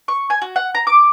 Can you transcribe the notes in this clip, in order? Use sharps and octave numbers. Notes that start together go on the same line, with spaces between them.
C#6
G#5
F#4
F#5
A#5
D6